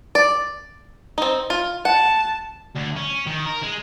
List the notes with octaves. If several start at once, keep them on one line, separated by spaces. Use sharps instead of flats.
D5
C4 D#4
F4
F#5 A5
D2
C#4
D#3
A#4
G#3